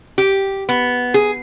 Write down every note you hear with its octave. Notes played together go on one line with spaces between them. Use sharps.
G4
B3
G#4